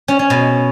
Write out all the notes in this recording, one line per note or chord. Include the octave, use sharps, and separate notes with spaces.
C#4
C#4
B2